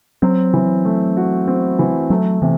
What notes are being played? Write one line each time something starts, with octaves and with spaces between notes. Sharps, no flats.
F#3 C4
E3
A3
F#4
C4
E3
F#3 A3
C3 E3